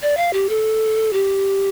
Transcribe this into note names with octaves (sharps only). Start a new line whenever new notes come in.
D5
F5
G4
A4
G4